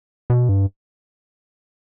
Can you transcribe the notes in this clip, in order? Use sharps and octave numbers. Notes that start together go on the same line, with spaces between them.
B2
G2